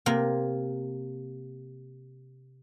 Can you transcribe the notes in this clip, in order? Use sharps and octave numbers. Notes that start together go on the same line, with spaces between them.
C3 A#3